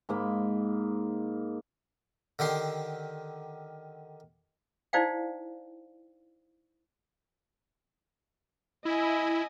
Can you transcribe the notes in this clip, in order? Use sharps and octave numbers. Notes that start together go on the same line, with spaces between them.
G#2 A#3 B5
D3 D#3 G4 C6
D#4 E4 C5 D5 F5 G5
E4 D#5 G#5